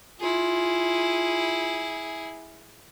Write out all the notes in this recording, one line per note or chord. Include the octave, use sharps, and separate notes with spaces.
E4 F4 G#4